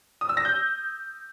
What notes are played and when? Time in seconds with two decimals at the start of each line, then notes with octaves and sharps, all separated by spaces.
0.21 D#6
0.29 E6
0.37 A#6
0.45 G6